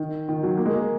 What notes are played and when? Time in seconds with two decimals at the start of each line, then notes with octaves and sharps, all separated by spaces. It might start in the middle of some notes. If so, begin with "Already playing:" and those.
Already playing: D#3
0.29 D#3
0.43 F#3
0.57 A#3
0.66 G#3
0.74 A#3